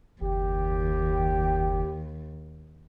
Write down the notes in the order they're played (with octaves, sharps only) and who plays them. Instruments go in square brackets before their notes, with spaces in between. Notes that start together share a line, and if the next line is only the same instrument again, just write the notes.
[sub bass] F#1 [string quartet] D#2 [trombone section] G4